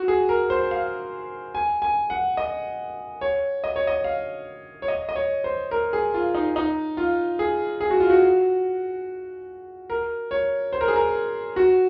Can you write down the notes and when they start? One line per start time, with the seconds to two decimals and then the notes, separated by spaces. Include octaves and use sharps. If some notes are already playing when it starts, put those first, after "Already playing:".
Already playing: F#4
0.08 G#4
0.29 A#4
0.50 C5
0.71 F5
1.55 G#5
1.82 G#5
2.10 F#5
2.37 D#5
3.21 C#5
3.64 D#5
3.76 C#5
3.87 D#5
4.04 F5
4.82 C#5
4.88 D#5
5.09 D#5
5.16 C#5
5.44 C5
5.71 A#4
5.93 G#4
6.14 F4
6.35 D#4
6.56 D#4
6.97 F4
7.39 G#4
7.81 G#4
7.90 F#4
8.00 F4
8.10 F#4
9.90 A#4
10.31 C#5
10.73 C5
10.81 A#4
10.88 G#4
10.96 A#4
11.56 F#4